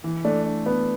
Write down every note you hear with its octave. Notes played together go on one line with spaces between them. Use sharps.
E3
A3 D4
D4
B3 D4